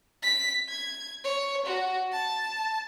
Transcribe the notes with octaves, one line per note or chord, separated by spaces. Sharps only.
B6
G#6
C#5
F#4
A5